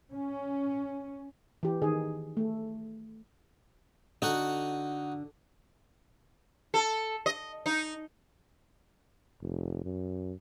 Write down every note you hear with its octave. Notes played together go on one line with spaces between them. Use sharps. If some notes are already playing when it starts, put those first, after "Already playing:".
C#4
E3 G4
D#3 G#4
A3
D3 D#4 F#4 F#5
A4
D#5
D#4
F1
F#2